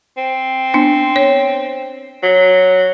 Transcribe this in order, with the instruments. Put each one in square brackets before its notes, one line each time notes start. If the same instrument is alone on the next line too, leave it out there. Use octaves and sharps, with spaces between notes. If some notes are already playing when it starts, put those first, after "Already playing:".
[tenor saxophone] C4
[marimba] B3 D4
C#5
[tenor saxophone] F#3